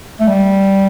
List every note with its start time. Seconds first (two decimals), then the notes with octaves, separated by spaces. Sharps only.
0.20 A3
0.28 G3